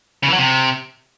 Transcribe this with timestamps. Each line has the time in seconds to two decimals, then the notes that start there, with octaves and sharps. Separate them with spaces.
0.23 C#3
0.28 E3
0.33 F#3
0.38 C3